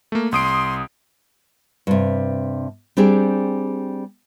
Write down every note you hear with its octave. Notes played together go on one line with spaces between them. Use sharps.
A3 A#3
C2 C6 D#6 D7
G2 C3
G3 C4 D4 G4 G#4